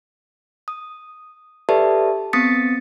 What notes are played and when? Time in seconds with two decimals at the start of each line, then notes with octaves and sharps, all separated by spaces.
0.68 D#6
1.69 G4 A4 B4 D5 E5 A5
2.33 B3 C4 D#6 A6 B6 C#7